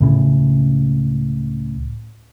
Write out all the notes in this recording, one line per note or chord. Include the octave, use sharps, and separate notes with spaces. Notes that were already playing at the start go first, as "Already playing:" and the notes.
C#2 A2 C#3